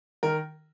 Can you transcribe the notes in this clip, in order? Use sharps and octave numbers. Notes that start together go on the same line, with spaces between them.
D#3 A#4